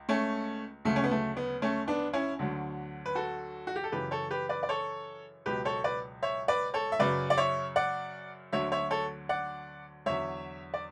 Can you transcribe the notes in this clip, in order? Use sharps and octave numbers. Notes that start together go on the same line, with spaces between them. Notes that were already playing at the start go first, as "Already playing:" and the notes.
Already playing: C#2
A3 C#4
D2 C#3 F#3 A3
C#4
B3
A3
B3
A3 C#4
B3 D4
C#4 E4
D2 D3 F#3
B4
F#4 A4
F#4
G4
A4
F#2 C#3 E3 G4 B4
A4 C#5
G4 B4
B4 D5
D5
A4 C#5
C#2 B2 F#3 G4 B4
A4 C#5
B4 D5
C#5 E5
B4 D5
A4 C#5
E5
F#2 C#3 F#3 B4 D5
D5
C#5 E5
D5 F#5
D2 D3 F#3 C#5 E5
C#5 E5
A4 C#5
D5 F#5
E2 D3 F#3 C#5 E5
D5